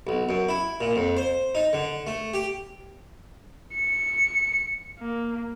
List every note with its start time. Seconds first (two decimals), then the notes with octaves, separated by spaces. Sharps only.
0.07 B1
0.29 F#2
0.49 E4
0.80 A#2
0.96 F2
1.17 C5
1.55 D#4
1.73 D3
2.07 A3
2.34 G4
3.74 C#7
5.00 A#3